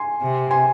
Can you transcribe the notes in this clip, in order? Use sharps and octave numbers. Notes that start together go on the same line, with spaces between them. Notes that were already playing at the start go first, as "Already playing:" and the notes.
Already playing: G#5 C6
C3
G#5 C6